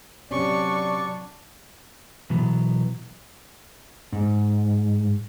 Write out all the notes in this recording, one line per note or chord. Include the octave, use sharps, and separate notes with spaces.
C3 F#3 C#4 D4 D5 C#6
B2 E3 F#3 B3
G#2